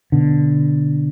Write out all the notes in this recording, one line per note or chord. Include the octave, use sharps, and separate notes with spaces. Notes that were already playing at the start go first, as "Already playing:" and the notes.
B2 D3